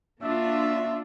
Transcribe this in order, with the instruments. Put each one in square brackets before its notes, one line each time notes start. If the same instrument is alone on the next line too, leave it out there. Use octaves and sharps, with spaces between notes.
[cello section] A#3 D4 F4 [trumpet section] F#4 E5